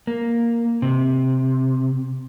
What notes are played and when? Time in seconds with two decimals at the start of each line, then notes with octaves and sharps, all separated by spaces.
0.07 A#3
0.82 C3